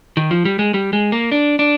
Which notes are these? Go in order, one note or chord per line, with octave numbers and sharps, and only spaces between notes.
D#3
F3
G3
G#3
G3
G#3
A#3
D4
D4